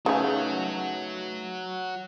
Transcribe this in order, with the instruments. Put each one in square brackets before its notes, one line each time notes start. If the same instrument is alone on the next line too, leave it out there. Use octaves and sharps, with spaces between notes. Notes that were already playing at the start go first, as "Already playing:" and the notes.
[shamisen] C#3 G#4 [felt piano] A3 D#4 B4 [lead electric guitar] F#4 C#5